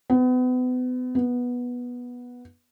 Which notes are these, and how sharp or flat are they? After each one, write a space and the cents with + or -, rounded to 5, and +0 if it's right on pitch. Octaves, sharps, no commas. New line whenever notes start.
B3 +35
B3 -10